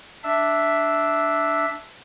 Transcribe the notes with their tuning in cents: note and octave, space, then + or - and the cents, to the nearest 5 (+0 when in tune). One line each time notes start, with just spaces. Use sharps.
D4 +0 E5 +0